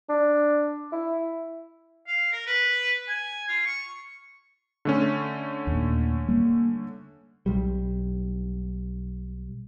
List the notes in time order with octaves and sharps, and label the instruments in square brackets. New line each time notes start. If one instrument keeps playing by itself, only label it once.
[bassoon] D4
E4
[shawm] F5
A#4
B4
G#5
F4
C#6
[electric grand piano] D3 A3 C#4
[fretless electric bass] D#2 A#2
G3 A#3
[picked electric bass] B1 G3